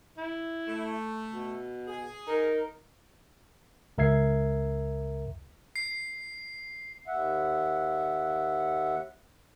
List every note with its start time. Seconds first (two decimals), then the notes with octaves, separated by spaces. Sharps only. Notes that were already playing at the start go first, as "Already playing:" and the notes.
0.17 E4
0.67 A3
1.32 B2
1.88 G#4
2.27 D#4 A#4
3.98 C#2 A#4 E5 G#6 C7
5.76 C7
7.07 D#2 E5 F#5